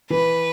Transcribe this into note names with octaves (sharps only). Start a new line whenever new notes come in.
E3 B4